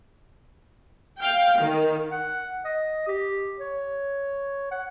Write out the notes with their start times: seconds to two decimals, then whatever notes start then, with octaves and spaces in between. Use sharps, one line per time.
1.19 F5 G5
1.57 D#3
2.11 F#5
2.65 D#5
3.08 G4
3.58 C#5
4.71 F#5